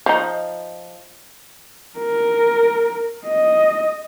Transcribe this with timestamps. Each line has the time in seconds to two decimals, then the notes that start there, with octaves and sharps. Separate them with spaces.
0.06 F3 D#4
1.98 A#4
3.25 D#5